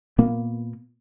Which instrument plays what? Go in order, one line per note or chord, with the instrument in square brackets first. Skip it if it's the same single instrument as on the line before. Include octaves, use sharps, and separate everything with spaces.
[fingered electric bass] A#2 A#3 B3